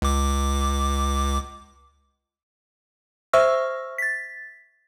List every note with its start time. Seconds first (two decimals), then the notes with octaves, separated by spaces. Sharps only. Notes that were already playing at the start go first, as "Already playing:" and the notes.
0.02 C#2 D6
3.33 C5 E5 C#6 E6 F6 A#6
3.98 A6 B6